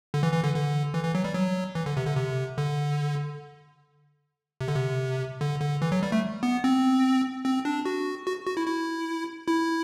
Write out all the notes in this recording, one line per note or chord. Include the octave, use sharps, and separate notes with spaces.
D3
E3
E3
D3
D3
E3
E3
F#3
G3
F#3
E3
D3
C3
D3
C3
D3
C3
D3
C3
D3
D3
E3
F#3
G3
A3
B3
C4
C4
D4
F#4
F#4
F#4
E4
E4
E4